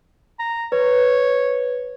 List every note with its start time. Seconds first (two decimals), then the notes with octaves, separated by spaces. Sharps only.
0.39 A#5
0.72 B4 C#5